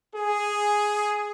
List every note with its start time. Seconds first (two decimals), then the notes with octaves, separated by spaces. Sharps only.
0.15 G#4